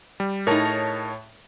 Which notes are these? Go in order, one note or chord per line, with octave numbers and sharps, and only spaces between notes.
G3
A2 D#4 G#4 A#4 C#5 A5